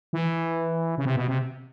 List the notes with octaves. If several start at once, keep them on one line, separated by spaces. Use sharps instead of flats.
E3
C#3
C3
B2
C3